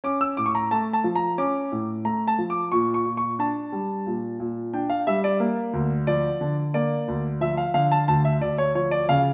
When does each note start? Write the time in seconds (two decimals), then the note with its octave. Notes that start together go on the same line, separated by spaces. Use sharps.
0.04 C#4 D6
0.21 E6
0.37 A2 D6
0.46 C#6
0.55 A#5
0.71 A3 A5
0.93 A5
1.04 F3
1.16 A#5
1.38 C#4 D6
1.72 A2
2.05 A3 A#5
2.28 A5
2.38 F3
2.50 D6
2.72 A#2 C#6
2.94 C#6
3.06 A#2
3.17 C#6
3.39 D4 A5
3.72 G3
4.07 A#2
4.40 A#2
4.74 D4 G5
4.90 F5
5.07 G3 E5
5.24 D5
5.40 A#3
5.74 D2
6.07 F3 D5
6.41 D3
6.74 A#3 D5
7.08 D2
7.41 F3 E5
7.57 F5
7.74 D3 F5
7.92 A5
8.08 D2 A5
8.25 E5
8.41 D2 D5
8.58 C#5
8.75 F3 C#5
8.91 D5
9.09 C#3 F5